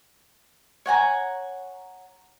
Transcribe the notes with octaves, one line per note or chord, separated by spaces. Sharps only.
C#5 F#5 G#5 A#5